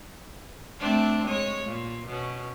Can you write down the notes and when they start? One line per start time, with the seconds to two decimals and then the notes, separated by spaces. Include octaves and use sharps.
0.79 A3 C4 D4
1.26 G#3 C#5
1.65 A#2
2.07 B2 C#4